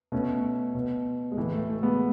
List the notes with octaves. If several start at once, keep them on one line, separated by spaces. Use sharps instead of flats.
B2 A3 C#4
B2
G#3
A2 E3 A3
A3
A3
G#3 B3